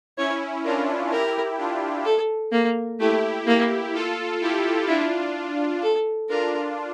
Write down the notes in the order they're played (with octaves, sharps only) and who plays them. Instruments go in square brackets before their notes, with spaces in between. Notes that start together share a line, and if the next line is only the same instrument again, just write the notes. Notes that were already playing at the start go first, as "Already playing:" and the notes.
[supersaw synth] C#4 E4 [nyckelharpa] C#5
[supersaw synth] D4 F4 [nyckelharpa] A#4
[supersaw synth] E4 G4 [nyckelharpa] A#4
[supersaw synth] D4 F4
[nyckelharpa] A4
A#3
[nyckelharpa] A3 [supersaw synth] E4 G4
[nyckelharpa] A#3
[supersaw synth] F4 A4
E4 G4
[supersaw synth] D4 F4 [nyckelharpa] E4
[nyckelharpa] A4
[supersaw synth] D4 F4 [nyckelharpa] A#4